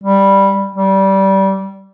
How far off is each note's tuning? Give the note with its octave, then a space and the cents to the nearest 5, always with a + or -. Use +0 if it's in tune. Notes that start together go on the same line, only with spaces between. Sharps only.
G3 +0
G3 -20